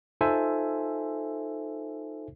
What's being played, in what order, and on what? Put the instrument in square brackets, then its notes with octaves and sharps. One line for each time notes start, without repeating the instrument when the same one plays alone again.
[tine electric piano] D#4 F4 A4 C5 E5 G#5